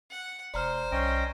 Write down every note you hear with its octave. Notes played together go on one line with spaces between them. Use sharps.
F#5
E1 C5 D5 A#5 F6
B1 C#4 D#5 G5